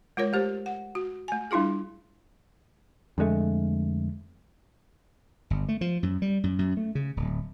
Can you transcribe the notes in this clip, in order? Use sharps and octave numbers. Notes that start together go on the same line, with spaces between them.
G#3 F4 A#4 C#5
A3 G4 C5
F#5
F#4
A3 G#5
G3 D4 E4 F4 G#4
F2 D3 G#3 A3
G1
A3
F3
F#2
G3
F#2
F#2
A3
C#3
D1